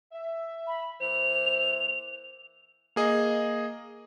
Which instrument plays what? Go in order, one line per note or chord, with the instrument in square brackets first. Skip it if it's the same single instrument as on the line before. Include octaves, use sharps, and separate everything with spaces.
[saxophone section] E5
[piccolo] B5
[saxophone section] E3 A#3 C5 [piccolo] F7
[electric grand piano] A#3 G#4 D#5